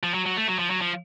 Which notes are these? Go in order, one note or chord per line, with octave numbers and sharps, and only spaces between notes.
F3
F#3
F#3
A3
F#3
F3
F#3
F3